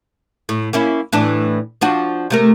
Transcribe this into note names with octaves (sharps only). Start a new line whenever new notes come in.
A2
A#3 C#4 E4
A2 E3 D4
F3 D4 F#4
C3 A3 A#4